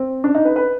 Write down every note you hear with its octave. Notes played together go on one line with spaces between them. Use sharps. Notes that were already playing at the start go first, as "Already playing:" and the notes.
Already playing: C4
D4
D#4
B4
B4